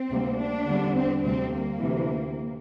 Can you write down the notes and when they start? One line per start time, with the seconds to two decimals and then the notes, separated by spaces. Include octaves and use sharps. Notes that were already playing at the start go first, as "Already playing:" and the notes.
Already playing: C4
0.10 D2 C3 G3 A#3
0.38 D4
0.67 E2 D3 G3
0.95 C4
1.23 D2 C3 G3 C4
1.53 A#3
1.80 D2 C3 E3